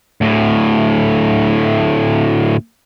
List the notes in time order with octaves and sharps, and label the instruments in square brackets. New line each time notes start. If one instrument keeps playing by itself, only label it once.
[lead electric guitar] D2 A2